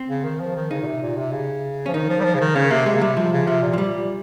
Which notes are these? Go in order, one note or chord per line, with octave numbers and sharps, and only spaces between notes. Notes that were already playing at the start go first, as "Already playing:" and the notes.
Already playing: C4
C#3
D#3
F3
D#3
C#3 D#4
A#2
C3
A#2
C3
C#3
F3 C#4
D#3 D#4
F3
G3
F3
C#3
D#3
C#3 C#4
C3 A#3
C3 G#3
C#3
C3 G3
C3 F3
C#3
C3 F3
A#2
F3
A#2 G3